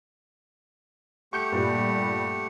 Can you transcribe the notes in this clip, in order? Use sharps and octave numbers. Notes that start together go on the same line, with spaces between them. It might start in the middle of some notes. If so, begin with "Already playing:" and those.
A3 G4 F#5 C#6 G6 C#7
G2 A#2 G3